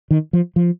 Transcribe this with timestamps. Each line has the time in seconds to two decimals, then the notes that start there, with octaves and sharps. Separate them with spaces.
0.11 D#3
0.33 F3
0.56 F3